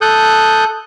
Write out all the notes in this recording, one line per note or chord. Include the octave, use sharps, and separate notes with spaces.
A4 D#6 F#6 G6